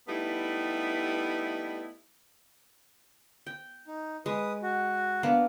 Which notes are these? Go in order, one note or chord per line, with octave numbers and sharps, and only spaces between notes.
G3 A3 B3 D#4 E4 G4
G5
D#4
G#3 B4 D#6
F#4
A#3 B3 D4